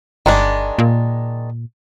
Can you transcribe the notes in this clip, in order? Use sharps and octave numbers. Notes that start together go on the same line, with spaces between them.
G1 D#3 G#3 D4
A#2